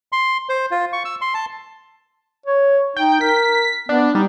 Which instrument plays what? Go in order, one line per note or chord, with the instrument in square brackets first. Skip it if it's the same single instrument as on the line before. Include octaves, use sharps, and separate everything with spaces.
[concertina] C6
C5
F4
C#6
E6
C6
A5
[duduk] C#5
[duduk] D#4 [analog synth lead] G5
[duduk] A#4 [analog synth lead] B6
[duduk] B3 [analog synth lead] D4
[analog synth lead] G3 [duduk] D#4